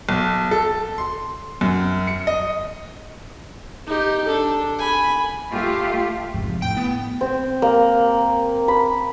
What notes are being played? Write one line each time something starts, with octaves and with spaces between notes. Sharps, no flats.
B1
A4
C6
F#2
C#7
D#5
D#4 G4
D4 A4
G#5 B5
A3 F4 G4
F2 G#2 C3
A2 G5
B3
C4
A#3
B5